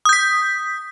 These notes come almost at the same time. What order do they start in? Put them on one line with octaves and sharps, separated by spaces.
D#6 G6 B6